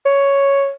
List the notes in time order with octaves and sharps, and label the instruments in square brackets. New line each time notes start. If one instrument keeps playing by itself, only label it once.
[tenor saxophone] C#5